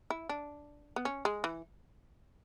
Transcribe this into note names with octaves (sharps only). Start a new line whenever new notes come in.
E4
D4
B3
C#4
G#3
E3